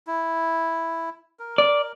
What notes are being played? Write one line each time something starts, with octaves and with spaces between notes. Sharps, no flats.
E4
A#4
D5